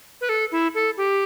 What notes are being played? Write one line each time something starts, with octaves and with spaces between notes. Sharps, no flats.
B4
A4
E4
A4
G4